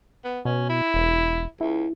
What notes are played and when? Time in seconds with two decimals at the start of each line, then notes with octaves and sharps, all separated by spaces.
0.24 B3
0.45 B2 C#4
0.69 E4
0.94 E1
1.61 C#2 E4